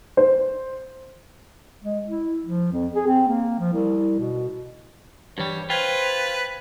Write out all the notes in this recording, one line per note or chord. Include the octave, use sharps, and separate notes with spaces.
C5
G#3
E4
F3
F2
G#4
C4
A#3
F3
C2
B2
G2 E3 G3 G4 C#5
F4 B4 C5 G5 G#6